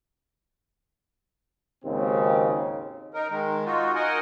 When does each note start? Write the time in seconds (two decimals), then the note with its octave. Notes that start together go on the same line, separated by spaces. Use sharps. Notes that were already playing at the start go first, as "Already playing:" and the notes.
1.84 G#1 D#2 G#2 C#3 C4
3.14 D#4 A#4
3.30 D#3 G#3
3.65 D#4 F4 F#4
3.95 D#4 A#4 D#5 F#5 G#5